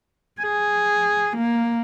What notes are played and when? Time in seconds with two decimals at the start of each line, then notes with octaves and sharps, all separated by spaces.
0.42 G#4
1.37 A#3